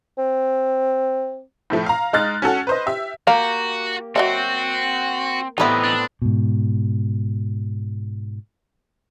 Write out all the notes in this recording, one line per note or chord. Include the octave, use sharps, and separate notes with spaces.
C4
A2 F3 A3
F5 A#5
G#3 D#4 F6 F#6 A6
C#4 F#4 A4 F#5
B4 C5 D#5
G4 E5
A#3 F#4 G4 F5
F#3 C4 F#4 D#5 E5
A2 E3 G3 B3 C4 D#4 E4
D4
G#2 B2